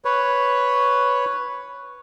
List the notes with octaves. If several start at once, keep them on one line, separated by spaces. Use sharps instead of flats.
B4 C#5